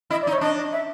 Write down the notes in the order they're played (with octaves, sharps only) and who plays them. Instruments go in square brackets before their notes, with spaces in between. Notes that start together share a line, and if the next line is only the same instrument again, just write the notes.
[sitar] E4 [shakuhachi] D#5
[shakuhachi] D5
[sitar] D#4
[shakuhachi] C#5
[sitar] D4 [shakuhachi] D#5
[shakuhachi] E5